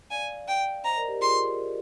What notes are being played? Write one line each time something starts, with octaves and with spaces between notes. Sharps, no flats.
D5 F5 G#5
G5
C5 D#5 A#5
A#4 D5
G4 A#4
F4 G#4 C6